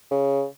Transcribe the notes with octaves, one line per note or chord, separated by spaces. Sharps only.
C#3